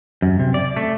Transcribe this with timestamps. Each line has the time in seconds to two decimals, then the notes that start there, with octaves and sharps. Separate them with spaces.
0.22 F#2
0.39 C3
0.54 D5
0.76 A3